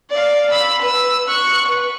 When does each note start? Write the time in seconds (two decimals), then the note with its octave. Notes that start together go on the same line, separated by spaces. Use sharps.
0.10 D5 F5
0.51 B5 E6
0.82 B4 E6
1.28 C#6 F#6
1.68 B4